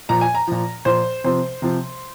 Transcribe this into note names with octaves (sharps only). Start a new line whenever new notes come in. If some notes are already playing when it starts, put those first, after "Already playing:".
A#2 F3 A#5
G#5
A#5
A#2 F3
A#2 F3 C5
C3 F3 C5
C3 F3